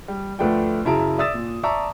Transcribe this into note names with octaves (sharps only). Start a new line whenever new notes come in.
G3
D2 F3 A3 B4 D5 G5
F#2 C#3 E4 A5 A#5 D7
D5 E5 D#6 E6 A6 E7
A#2
D5 E5 A5 A#5 C#6 E6